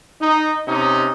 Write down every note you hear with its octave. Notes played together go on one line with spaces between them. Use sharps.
D#4
C3 C#4 D#4